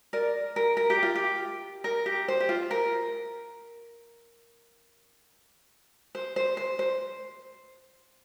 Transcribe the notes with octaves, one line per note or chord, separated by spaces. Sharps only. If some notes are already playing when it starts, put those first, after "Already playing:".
A#4 D5
A#4
A#4
G4
F4
G4
A#4
G4
C5
G4
F4
A#4
C5
C5
C5
C5